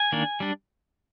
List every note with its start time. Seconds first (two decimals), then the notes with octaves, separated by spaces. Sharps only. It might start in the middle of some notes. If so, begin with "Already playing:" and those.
Already playing: G#5
0.12 D#3 A#3 D4
0.40 G3 D4